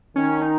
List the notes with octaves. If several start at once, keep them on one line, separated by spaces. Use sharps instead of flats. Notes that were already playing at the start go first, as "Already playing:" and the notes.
D#3 C#4
D#4